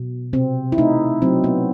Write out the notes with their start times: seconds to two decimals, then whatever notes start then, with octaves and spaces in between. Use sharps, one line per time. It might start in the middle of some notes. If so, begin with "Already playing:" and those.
Already playing: B2
0.33 C3 C4
0.72 E4
0.78 A3 D#4
1.22 F#3 C4
1.44 B3